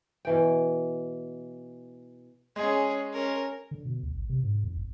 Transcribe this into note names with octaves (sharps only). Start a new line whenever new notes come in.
B2 E3 G5
G#3 C#4 G#4
C#4 A#4
D3
B2
D2
G#1
C3
G#2
F2
G1